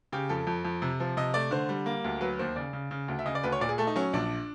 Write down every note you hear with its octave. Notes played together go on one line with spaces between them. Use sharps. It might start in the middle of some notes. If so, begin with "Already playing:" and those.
C#3 G4
F2 A4
F2
F2
C3
F3
C3 D#5
A3 D5
D3 C5
G3
A#3
D2
F#3 B4
D#2 C5
C#3 D5
C#3
C#3
D2
E5
C#3 D#5
D5
D2 B4
C#5
A#2 D5
G#4
A3 A4
D#4
F#3 C#4
A#1 D4